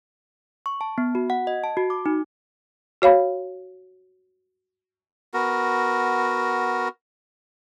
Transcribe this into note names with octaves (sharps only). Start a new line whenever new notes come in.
C#6
A5
B3
F#4
F#5
D#5
A5
F#4
D6
D#4
F#4 C#5 F5 B5
B3 F#4 A#4